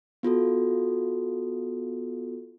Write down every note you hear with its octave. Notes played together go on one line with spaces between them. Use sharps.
B3 F4 F#4 A4